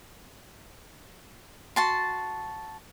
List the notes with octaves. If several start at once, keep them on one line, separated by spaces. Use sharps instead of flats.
F#4 A5 C6